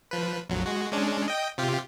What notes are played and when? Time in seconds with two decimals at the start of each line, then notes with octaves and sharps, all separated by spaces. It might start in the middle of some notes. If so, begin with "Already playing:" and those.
0.11 F3 B4
0.49 A#1 F2 F#3
0.66 G#3 F#4
0.92 G#3 C#4 D4
1.28 D#5 G5
1.58 C3 F4 G4